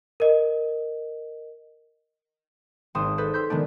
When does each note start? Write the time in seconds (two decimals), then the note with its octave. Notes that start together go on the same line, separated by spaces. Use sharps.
0.20 A#4 D#5
2.95 G#1 C4 C6 D#6 E7
3.18 A4 B4 C5
3.33 C6 E6 G6 B6
3.50 D#3 G#3 B3 D4